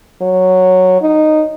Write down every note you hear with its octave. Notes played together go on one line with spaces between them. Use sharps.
F#3
D#4